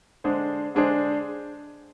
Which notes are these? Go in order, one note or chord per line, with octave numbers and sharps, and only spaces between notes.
D3 G#3 D4 G#4 C5
D3 G#3 D4 G#4 C5